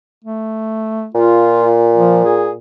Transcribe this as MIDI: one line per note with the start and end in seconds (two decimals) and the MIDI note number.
0.25 1.08 57
1.15 2.58 46
1.15 1.74 65
1.96 2.21 53
2.25 2.51 68